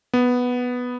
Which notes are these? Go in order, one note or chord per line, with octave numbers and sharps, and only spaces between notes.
B3